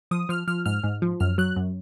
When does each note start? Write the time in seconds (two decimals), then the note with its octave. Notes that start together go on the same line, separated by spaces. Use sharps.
0.11 F3 D#6
0.29 F3 F6
0.47 F3 F6
0.66 G#2 F6
0.84 G#2
1.02 F3
1.20 F#2 F6
1.38 F#3 F#6
1.56 F#2